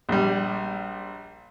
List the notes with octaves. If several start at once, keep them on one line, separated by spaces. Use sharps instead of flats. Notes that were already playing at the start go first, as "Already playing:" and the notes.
A#1 G3